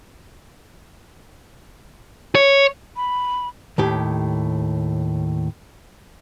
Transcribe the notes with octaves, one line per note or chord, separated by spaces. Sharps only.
C#5
B5
D#2 A2 G4